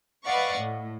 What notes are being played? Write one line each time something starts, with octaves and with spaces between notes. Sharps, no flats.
B4 D5 D#5 F5 F#5 C#6
A2